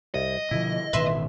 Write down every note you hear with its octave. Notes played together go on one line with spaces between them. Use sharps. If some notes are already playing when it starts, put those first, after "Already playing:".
C2 D#5
B2 D3 F3 E4
A1 B2 D#3 B4 E5 C6